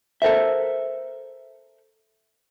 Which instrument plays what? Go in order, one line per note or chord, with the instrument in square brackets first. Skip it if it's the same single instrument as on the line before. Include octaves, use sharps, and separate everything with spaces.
[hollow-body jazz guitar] A4 A#4 C5 E5